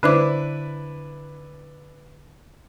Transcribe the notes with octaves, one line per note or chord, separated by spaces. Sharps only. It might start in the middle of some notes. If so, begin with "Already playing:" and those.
D3 D4 E4 B4 C5 D6